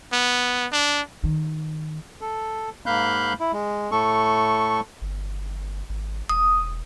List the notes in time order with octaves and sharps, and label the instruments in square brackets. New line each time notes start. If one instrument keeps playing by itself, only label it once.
[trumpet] B3
D4
[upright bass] D#3
[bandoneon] A4
G#2 A#3 F5 B5 F#6 G6
E4
G#3
A2 A3 A4 C#6
[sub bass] G1
G#1
[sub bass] E1 [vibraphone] D#6